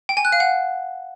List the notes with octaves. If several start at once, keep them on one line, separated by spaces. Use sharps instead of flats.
G5
G#5
F#6
F5
F#5